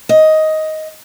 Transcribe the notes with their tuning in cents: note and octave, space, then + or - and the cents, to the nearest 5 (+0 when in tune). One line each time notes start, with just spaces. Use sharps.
D#5 +10